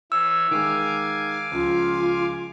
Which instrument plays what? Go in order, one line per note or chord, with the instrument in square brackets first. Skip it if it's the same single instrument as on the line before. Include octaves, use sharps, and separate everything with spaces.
[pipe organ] E3 C#5 [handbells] E6
[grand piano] D#3 G#3 [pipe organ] F5 G#5 D6
[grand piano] C#2 F3 [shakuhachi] F4